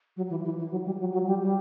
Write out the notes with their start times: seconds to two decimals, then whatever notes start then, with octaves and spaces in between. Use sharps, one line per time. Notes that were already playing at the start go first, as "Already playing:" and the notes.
0.16 F#3
0.30 E3
0.44 E3
0.57 E3
0.71 F#3
0.85 G3
0.99 F#3
1.12 F#3
1.26 G3
1.42 G3